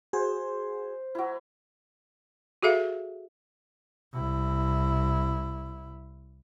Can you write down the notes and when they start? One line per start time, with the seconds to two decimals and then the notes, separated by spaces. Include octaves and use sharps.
0.13 F#4 G#4 C5
1.15 F#3 E4
2.63 F#4 G#4 A4 E5 F5
4.13 C2 E4